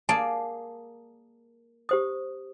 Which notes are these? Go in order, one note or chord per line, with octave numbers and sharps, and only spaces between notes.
A#3 G#4 D5 A5
G4 C5 D#6